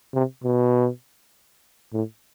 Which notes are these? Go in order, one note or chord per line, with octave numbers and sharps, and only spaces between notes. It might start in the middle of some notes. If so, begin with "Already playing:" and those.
C3
B2
A2